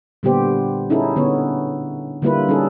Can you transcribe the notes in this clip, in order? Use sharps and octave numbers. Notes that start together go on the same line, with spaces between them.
A#2 D3 G3 B3 G4 C5
C#4 D#4 E4 G#4 A4
D3 B3 C#5
D3 G3 A#3 E4 F4 B4
G3 C#4 D#4 G#4 A4